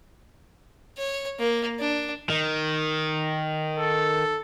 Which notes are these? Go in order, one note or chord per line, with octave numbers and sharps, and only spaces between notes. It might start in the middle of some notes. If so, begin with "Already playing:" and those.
C#5
A#3
D4
D#3
A4